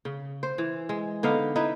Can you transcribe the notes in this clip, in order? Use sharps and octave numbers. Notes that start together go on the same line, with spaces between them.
C#3
C5
E3
G#3
D3 B3 D#4 F5
D#4 E4 B4